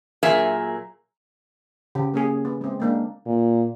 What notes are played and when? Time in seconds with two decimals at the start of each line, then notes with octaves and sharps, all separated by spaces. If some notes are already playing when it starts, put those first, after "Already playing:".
0.23 A#2 F#3 G#4 A#4 E5
1.95 C#3 G4
2.14 A#3 C#4 G#4
2.45 B3
2.61 G#3 C4
2.80 G#3 A#3 D4
3.26 A#2